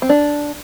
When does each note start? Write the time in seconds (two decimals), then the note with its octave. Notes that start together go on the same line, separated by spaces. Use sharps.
0.02 C4
0.09 D4